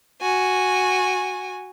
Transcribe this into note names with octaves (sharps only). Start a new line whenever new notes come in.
F#4 G#5